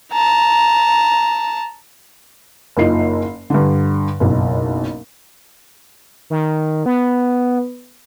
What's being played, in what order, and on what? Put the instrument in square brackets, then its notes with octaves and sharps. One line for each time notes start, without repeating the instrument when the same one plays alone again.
[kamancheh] A5 A#5
[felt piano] F#1 A#3 D#4 F4 C7
G2 D3
F#1 B1
[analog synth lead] D#3
B3